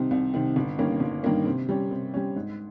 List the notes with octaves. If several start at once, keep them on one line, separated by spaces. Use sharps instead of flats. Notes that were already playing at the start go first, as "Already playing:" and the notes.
Already playing: C2 C3 D#3
C2
C3 D#3
G1
G2 D#3 A#3 C#4
G1
G2 D#3 A#3 C#4
C3
G3 C#4
C3
G3 C#4
G#2